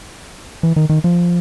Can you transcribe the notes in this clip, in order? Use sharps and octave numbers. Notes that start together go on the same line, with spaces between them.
E3
D#3
D#3
F3